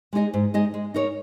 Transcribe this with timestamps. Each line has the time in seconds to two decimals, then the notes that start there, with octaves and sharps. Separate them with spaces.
0.13 G#3 D#4 G#4 D#5
0.34 G#2
0.54 G#3 D#4 G#4 D#5
0.74 G#3
0.94 D#4 A#4 C#5